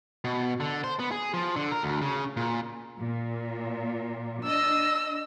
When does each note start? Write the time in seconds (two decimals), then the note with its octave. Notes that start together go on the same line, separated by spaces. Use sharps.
0.24 B2
0.60 D3
0.84 C5
0.99 B3
1.11 G#4
1.34 F3
1.56 D3
1.72 A#4
1.83 D2
2.02 C#3
2.37 A#2
3.00 A#2
4.44 D4 D#5 E6